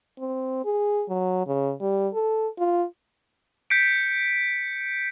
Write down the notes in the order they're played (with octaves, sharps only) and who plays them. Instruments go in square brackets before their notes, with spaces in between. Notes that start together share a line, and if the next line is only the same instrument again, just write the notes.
[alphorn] C4
G#4
F#3
C#3
G3
A4
F4
[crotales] G6 B6 C#7 D7